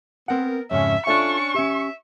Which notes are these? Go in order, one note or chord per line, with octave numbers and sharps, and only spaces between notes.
B3 C4 A#4 F#5
F2 G#2 C#3 C#4 E5
C#4 D4 F4 A4 E5 C#6
C#4 G4 E5